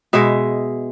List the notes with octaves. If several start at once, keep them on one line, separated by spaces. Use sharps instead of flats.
B2 G#3 E5